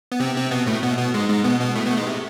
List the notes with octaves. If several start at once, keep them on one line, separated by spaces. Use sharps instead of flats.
B3
C3 C4
C3 C4
B2 B3
A2 A3
B2 B3
B2 B3
G#2 G#3
G#2 G#3
B2 B3
B2 B3
A2 A3
B2 B3
A3
G#2 G#3
C3